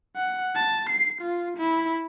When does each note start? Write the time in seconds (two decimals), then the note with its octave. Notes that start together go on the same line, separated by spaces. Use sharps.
0.16 F#5
0.56 A5
0.90 C7
1.22 F4
1.57 E4